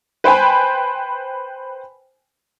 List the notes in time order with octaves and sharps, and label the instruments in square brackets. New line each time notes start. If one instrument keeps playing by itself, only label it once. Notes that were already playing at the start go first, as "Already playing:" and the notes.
[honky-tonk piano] B4 C5 G5 G#5 B5